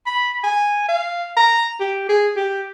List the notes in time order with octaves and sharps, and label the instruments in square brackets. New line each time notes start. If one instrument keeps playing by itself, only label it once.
[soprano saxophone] B5
G#5
F5
A#5
G4
G#4
G4